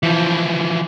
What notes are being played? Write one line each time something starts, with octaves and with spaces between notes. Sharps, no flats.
E3 F3